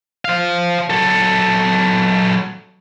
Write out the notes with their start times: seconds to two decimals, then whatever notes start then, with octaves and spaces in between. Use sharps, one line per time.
0.25 C5 F5
0.90 F#3 A4